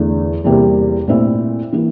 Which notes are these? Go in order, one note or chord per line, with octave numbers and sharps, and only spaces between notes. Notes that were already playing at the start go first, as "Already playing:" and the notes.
Already playing: E2 D3 A3
E2 C3 G3 A#3
A#2 A3 C4 E4
E3 A#3 E4